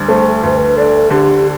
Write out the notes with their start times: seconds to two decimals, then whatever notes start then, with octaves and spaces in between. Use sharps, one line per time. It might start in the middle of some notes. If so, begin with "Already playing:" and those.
Already playing: D2 G3
0.08 A3 C5
0.43 D2 B4
0.50 C5
0.57 B4
0.77 D4 A4
1.11 D3 G4